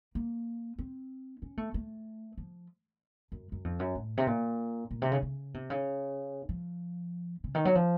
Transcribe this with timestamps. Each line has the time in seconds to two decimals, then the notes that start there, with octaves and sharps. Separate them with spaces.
0.15 A#3
0.79 C4
1.42 C#4
1.57 A3
1.74 A3
2.38 F3
3.32 F#2
3.52 F#2
3.64 F2
3.79 F#2
3.95 A2
4.18 C3
4.27 A#2
4.91 A#2
5.02 C3
5.12 C#3
5.22 C#3
5.54 C3
5.70 C#3
6.49 F3
7.44 C#3
7.55 D#3
7.65 F#3
7.75 F3